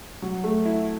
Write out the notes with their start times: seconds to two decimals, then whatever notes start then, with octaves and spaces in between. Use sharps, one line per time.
0.22 F#3
0.44 A3
0.65 E4